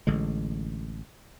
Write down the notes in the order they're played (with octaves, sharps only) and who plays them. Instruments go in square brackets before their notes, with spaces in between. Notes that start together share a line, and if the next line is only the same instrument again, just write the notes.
[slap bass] A1 D3 G#3